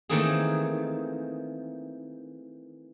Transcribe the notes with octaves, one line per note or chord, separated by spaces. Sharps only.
D#3 E3 A3 A#3 C4 G#4